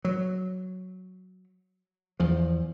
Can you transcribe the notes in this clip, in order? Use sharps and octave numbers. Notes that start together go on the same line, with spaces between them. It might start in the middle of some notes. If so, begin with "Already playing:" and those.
F#3
E2 F3